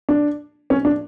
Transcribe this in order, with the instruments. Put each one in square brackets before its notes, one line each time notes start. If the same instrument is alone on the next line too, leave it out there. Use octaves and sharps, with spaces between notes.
[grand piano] D4
C#4
D4